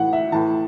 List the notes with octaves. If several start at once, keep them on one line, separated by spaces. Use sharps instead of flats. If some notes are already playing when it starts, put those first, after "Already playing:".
Already playing: A2 E3 F#5
E5
A2 E3 A5